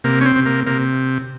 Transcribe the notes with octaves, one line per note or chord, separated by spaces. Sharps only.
C3 A#3
C#4
C4
C3
A#3
C3 A#3